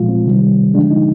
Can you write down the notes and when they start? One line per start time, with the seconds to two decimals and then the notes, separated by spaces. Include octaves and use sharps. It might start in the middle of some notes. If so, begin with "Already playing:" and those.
Already playing: A#2 F3 G#3 F4
0.09 C4
0.26 C3 D#3 G3
0.74 D3 F3 G#3 D4
0.91 D#4